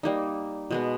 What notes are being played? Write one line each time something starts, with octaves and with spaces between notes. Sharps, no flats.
G3 A#3 D#4
B2 G#3 B3